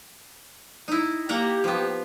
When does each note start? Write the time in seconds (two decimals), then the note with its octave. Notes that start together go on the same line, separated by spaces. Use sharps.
0.88 D#4 E4
1.29 A#3 G4 F#5 A#5
1.64 F3 B3